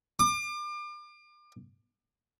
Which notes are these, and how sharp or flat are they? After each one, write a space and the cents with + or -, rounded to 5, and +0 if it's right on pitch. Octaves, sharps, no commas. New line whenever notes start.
D6 +35